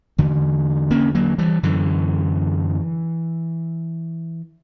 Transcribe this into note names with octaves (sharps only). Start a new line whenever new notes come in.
E2 D3
A#3 C#4
F#3 A#3
E3 G3
F#2 D3 E3